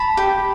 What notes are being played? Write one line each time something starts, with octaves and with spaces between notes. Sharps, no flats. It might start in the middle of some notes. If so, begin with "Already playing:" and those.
Already playing: A5 B5
G4